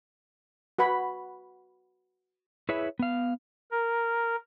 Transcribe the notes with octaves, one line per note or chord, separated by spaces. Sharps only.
F#4 B4 F#5 B5
E4 G#4 B4 C#5 E5
B3 F5
A#4